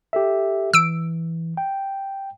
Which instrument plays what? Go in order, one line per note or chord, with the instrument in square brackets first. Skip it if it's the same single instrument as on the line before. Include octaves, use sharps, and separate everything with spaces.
[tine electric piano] G4 A4 E5
[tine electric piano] E3 [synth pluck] E6 D7
[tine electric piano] G5